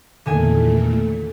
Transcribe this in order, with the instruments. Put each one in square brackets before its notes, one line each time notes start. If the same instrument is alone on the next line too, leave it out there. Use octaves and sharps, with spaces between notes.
[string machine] E2 A#2 A3 [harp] D3 D#3 G#5